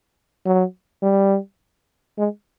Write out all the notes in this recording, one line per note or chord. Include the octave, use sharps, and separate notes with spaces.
F#3
G3
G#3